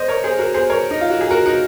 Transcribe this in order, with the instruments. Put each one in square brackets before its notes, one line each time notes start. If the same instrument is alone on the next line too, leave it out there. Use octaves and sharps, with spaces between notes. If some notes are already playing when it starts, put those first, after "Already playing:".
Already playing: [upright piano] C5 D#5
A#4 C#5
G#4 C5
F#4 A#4
G#4 C5
A#4 C#5
D#4
F4
F#4
G#4
F#4 A#4
D#4 F#4